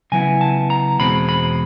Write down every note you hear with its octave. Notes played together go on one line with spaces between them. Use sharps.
C#3 F#3 B3 E4 G#5
A5
A#5
E2 B2 G#3 C4 B5
B5